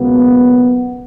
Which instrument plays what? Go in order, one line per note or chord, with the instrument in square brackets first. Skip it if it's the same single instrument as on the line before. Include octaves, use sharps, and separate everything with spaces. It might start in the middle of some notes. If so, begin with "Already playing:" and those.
Already playing: [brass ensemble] C#2 B2 F#3 A#3 B3